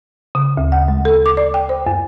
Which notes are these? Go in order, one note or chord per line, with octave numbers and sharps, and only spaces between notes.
C#3
D2
F#5
G#3
A4
D6
D5
G5
C5
F#2